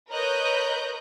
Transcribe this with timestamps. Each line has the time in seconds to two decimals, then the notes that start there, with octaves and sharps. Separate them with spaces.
0.10 A#4 B4 C#5 D#5 F#6 G6